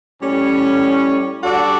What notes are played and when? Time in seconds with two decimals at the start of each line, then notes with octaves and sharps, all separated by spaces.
0.21 A2 G3 C#4
1.41 G3 D4 F#4 A4 D5